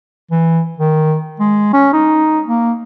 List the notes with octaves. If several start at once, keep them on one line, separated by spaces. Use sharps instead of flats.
E3
D#3
G#3
C#4
D#4
A#3